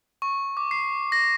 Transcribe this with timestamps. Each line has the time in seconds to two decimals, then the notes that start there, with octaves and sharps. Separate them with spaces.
0.22 C#6
0.57 D6
0.71 C7
1.12 A#6